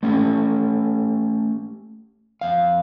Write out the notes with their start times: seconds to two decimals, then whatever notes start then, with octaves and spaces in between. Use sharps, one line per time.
0.03 A3 C#4 F4 G4 A4
2.41 F2 F5